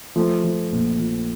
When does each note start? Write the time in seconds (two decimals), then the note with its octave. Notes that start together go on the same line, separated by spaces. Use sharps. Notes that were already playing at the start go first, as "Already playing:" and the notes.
0.16 F3 A3
0.44 F3
0.72 A#1
0.99 F3